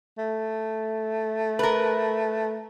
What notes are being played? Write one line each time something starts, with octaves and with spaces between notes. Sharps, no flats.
A3
A#4 B4